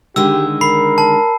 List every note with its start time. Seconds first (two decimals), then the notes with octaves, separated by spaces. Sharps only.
0.16 D3 D#3 G#3 G4 E6
0.61 A#4 B5 C7
0.98 A5